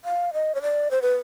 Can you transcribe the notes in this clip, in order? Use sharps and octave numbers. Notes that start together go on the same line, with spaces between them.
F5
D#5
C#5
D5
C5
B4